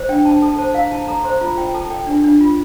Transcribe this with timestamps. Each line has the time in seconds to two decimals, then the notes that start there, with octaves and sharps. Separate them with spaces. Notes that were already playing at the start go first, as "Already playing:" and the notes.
Already playing: C5
0.09 D4 G5
0.25 D4 A5
0.42 A4 A5
0.59 C5 A5
0.74 E4 F5
0.91 E4 A5
1.08 A4 A#5
1.24 C5 C6
1.40 F4 A#5
1.58 F4 G5
1.74 A4 A5
1.90 A4 G5
2.07 D4
2.24 D4
2.40 F4